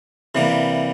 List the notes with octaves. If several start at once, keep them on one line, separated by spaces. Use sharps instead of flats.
C3 E3 G3 A#3